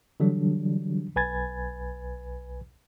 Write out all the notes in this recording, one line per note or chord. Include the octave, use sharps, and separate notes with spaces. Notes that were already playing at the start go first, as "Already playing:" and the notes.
D3 E3 F#3 G3 D4
B1 B4 G#5 B5 G#6 A6